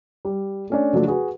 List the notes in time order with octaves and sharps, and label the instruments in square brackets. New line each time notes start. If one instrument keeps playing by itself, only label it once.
[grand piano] G3
A3 C#4 D4
C#3 F3 F#3 A3 D4
F#4 G#4 B4